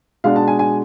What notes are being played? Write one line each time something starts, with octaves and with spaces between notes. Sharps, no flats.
B2 G#3 D4 F5
A5
G#5
G#5